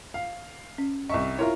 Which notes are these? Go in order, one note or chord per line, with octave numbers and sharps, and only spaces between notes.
F5
C#4
C2 D#5 E5 C#6
E4 F4 A#4 C#5 E5